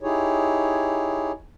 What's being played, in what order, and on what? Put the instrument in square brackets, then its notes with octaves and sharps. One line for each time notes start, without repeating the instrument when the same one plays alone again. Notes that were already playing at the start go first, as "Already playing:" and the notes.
[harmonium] D#4 E4 G4 G#4 C#5